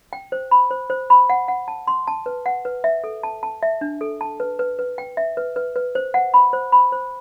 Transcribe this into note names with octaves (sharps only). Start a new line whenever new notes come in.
G5
C5
B5
C5
C5
B5
F#5
F#5
A5
C6
A5
B4
F#5
B4
E5
A4
A5
A5
E5
D4
A4
A5
B4
B4
B4
G5
E5
B4
B4
B4
C5
F#5
B5
C5
B5
C5